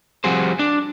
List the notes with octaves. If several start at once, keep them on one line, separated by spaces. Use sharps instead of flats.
F3 G3 C4 F#4 G#4 C5
D4